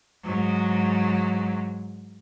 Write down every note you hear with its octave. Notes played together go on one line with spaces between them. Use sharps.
G#2 F#3